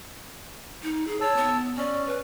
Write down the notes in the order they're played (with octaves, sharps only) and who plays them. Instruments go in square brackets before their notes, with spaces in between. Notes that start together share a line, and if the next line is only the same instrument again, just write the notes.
[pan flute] D#4
G#4
[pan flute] C#5 [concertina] A5 E6
[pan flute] B3
[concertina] C#4 [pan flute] D5
[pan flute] B4